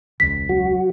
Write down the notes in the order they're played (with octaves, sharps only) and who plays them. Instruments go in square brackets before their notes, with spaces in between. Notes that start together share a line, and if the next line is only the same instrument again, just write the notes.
[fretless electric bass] E1 C#2 G#3 [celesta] B6
[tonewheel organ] F#3 F#4